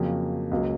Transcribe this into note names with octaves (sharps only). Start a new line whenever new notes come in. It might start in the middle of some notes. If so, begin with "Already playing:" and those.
Already playing: F2 C#3 F#3 A#3
C#2 C#3 F#3 A#3